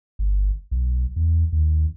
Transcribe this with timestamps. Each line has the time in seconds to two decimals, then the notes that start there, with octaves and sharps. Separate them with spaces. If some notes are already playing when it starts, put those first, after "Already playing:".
0.19 G1
0.71 B1
1.16 E2
1.52 D#2